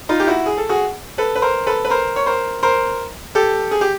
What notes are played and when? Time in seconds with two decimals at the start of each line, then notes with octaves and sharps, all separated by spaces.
0.09 D#4 F4
0.20 G4
0.27 E4 F#4
0.46 G#4
0.58 A4
0.69 F#4 G#4
1.18 A4 B4
1.35 B4
1.42 A#4 C5
1.67 A4 B4
1.84 B4
1.90 A#4 C5
2.16 C#5
2.26 A#4 C5
2.63 A#4 C5
3.35 G4 A4
3.71 G#4
3.81 G4